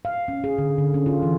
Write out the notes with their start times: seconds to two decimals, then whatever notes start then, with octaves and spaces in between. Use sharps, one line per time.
0.05 F5
0.28 C#4
0.44 G#4
0.58 D3
0.78 D3
0.94 C#4
1.06 F4
1.22 E3